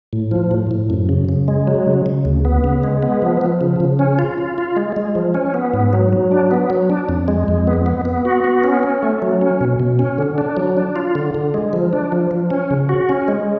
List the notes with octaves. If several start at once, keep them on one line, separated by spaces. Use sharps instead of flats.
A2
F3
A2
A2
F#2
C#3
C#3
G#3
F#3
C#3
C#3
D2
B3
C#3
G#3
B3
F3
F3
C#3
C#3
C#4
F4
F4
F4
G#3
G#3
F3
C#4
B3
G#2
F#3
F#3
D4
B3
F#3
D4
F2
G#3
F2
B3
B3
B3
F#4
B3
C#4
C#4
A3
F#3
C#4
B2
B2
C#4
D3
D4
F#3
D4
F4
D3
D3
G#3
F3
D4
F3
F3
C#4
C#3
F#4
C#4
G#3